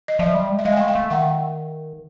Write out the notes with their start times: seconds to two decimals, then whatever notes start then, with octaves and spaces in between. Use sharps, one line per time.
0.08 D#5
0.19 F3 D5 E5
0.35 G3
0.50 G#3
0.59 E5
0.65 G#3 D#5 F5
0.72 G#5
0.77 F5 G5
0.81 A3
0.88 F5 G5
0.95 A3
1.10 D#3 E5 F#5